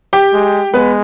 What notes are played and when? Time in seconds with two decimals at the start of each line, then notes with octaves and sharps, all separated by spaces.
0.13 G4 G5
0.33 G#3
0.73 G#3 B3 B4